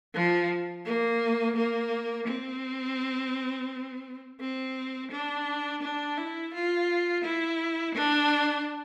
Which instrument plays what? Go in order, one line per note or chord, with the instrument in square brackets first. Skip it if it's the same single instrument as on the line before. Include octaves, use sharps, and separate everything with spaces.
[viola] F3
A#3
A#3
C4
C4
D4
D4
E4
F4
E4
D4